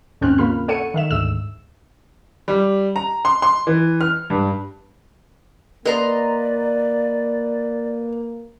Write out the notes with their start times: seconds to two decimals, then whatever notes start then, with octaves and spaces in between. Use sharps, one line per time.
0.21 D#2 G#2 C4 C#4 F6 F#6
0.38 C#3 A#3 F4 B5 F6
0.68 A4 C#5 F#5 C#7 D#7
0.94 D#3 E5 E7
1.11 D2 G#2 E6 E7
2.48 G3
2.96 A#5
3.25 C6
3.42 C6
3.67 E3
4.01 F6
4.30 G2
5.86 A#3 B4 D5 D#5 A#5 C6